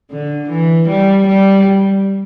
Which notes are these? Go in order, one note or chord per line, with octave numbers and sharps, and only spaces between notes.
D3
E3
G3
G3